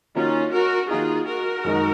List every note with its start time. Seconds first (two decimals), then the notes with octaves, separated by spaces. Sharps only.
0.15 D#3 A#3 C#4 D#4 F4 F#4
0.53 F#4 A#4
0.90 D#3 A#3 D#4 F4 F#4 G#4
1.27 F#4 A#4
1.64 F#2 D#3 G#3 D#4